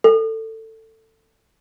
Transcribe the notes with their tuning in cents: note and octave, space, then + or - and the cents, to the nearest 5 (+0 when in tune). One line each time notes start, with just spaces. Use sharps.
A4 +20